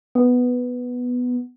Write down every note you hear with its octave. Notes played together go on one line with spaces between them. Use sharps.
B3